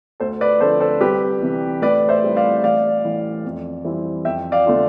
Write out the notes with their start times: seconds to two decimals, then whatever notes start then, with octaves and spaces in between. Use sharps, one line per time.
0.20 D2 A4 C5
0.41 B4 D5
0.60 D3 F3 A3 C4 A4 C5
0.80 A4 C5
1.01 C2 G4 B4
1.42 C3 E3
1.82 A2 B4 D5
2.09 C5 E5
2.23 G3 C4 E4
2.36 D5 F5
2.64 A1 D5 F5
3.04 A2 E3
3.45 F2
3.84 E3 G3 C4 E4
4.25 F2 E5 G5
4.52 D5 F5
4.66 D3 A3 D4 F4